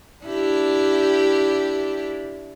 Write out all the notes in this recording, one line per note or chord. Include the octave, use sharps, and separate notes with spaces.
D4 E4 G4